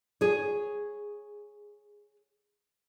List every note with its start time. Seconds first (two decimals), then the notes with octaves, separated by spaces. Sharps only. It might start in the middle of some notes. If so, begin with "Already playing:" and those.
0.21 G#4 C#5